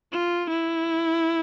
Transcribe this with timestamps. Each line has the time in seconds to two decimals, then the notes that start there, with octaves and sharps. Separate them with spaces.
0.12 F4
0.50 E4